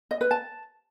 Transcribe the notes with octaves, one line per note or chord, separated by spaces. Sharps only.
D#5
B4
A5